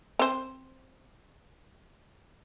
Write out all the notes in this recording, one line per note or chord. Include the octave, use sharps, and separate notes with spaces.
C4 C5